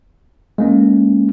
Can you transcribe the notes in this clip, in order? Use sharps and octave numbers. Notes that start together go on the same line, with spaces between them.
G#3 A#3 C#4